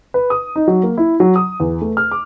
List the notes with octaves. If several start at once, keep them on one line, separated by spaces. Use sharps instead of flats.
B4
D#6
D#4
F#3
A#3
E4
F#3
D#6
E2
A3
F6
D6